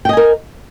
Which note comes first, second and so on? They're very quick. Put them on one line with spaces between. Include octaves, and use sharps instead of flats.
G5 D#5 G#5 A#4